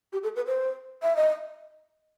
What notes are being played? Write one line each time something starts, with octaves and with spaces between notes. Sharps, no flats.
G4
A4
B4
C5
E5
D#5